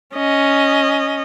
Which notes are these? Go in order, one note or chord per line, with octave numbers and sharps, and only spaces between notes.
C#4 D#5